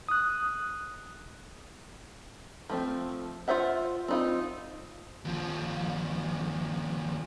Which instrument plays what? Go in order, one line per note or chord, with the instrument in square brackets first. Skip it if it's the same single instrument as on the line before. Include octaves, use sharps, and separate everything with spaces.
[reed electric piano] D#6 F#6
[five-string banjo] F3 A3 C4
F4 G#4 C5 E5 F#5
C4 D#4 F4
[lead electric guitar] D#2 F3